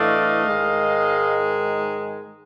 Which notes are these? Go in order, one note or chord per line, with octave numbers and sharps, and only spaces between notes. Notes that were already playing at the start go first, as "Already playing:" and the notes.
Already playing: A2 E3 A3 D4 D#5 F5
G#2 D#3 G#3